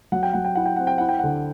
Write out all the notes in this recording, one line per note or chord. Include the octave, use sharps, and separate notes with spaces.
F#3 F#5
G5
F#3 F#5
G5
E4 F#5
G5
C4 F#5
G5
E4 F#5
G5
D3 F#5